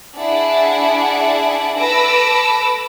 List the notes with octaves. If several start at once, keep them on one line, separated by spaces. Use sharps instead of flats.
D4 E4 G#4 D5 E5 F#5
A4 B4 A5 D6 E6 A#6